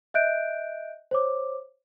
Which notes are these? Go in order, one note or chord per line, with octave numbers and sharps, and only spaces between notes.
D#5 E5 F#6 G6 D7
C5 C#5 D6